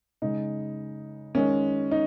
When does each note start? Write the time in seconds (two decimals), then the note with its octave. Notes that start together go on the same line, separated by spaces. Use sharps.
0.22 C#3 G#3 D#4
1.35 D#3 G#3 C#4
1.91 D#4